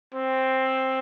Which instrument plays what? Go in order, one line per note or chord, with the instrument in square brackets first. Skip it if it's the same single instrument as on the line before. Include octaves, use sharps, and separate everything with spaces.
[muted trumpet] C4